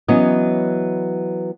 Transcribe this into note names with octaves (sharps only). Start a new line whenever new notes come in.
E3 F#3 B3 C#4 C#5 D#5